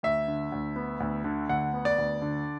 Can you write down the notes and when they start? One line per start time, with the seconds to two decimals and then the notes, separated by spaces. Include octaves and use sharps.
0.03 D2 E5
0.27 D3
0.52 D2
0.76 B3
1.00 D2
1.24 D3
1.49 D2 F#5
1.74 B3
1.85 D5
1.98 D2
2.22 D3